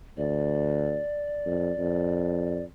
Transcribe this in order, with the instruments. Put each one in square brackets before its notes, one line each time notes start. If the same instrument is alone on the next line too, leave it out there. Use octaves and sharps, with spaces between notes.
[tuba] D2 [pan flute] D5
[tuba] F2
F2